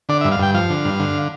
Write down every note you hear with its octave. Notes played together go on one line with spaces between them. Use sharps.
D3 D5
E5
G2
F5
G2 G5
F3 F5
D3
G2
D3